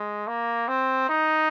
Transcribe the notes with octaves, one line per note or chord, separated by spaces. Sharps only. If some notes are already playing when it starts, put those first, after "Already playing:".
Already playing: G#3
A#3
C4
D#4